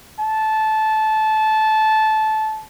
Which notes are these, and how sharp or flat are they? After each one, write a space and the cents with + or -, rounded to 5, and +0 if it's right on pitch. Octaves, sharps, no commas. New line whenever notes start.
A5 -15